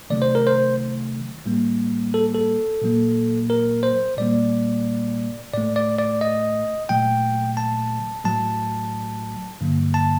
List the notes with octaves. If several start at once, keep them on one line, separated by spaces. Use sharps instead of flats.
C3 D#3 F#3 A3 D5
C5
A#4
C5
A2 G3 A#3
A4
A4
A#2 F#3 A#3
A#4
C5
A#2 G3 A#3 D5
A2 A3 D5
D5
D5
D#5
A#2 F#3 A3 G5
A5
A2 F#3 A3 A5
G2 D3 F#3 A#3
A5